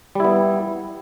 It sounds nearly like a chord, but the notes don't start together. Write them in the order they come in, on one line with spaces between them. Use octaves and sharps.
G3 E4 B3